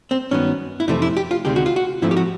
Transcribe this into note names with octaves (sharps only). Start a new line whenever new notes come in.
C4
G2 D#3 F#3 B3 C#4
E4
F2 C3 E3 A3 C4 D#4
E4
G4
F4
D2 C3 D#3 G#3 G4
F#4
F4
F#4
G#2 F3 A3 C4 E4
G4
F#4